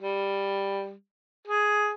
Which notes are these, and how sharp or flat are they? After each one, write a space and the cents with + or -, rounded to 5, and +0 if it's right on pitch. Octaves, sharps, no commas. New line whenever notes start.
G3 +5
G#4 +10